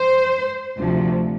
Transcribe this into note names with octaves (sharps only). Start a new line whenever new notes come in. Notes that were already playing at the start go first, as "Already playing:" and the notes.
Already playing: C5
D2 C3 F3